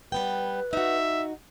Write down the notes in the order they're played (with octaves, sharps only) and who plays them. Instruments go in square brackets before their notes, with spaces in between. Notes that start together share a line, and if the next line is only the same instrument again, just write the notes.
[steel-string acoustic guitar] G3 B3 G5 [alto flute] B4
[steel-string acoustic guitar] D#4 F#4 [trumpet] E5